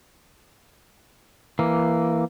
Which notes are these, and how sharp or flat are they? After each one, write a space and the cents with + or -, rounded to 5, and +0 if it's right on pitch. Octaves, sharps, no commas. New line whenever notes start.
E3 +10 A#3 +0